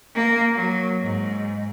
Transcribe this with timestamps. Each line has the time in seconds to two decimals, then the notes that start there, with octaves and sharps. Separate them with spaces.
0.15 A#3
0.54 F#3
1.01 G#2